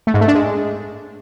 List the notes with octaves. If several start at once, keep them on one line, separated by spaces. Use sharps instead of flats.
A3
G#2
A3
D4
G#3